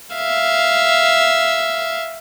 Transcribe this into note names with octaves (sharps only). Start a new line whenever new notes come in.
E5 F5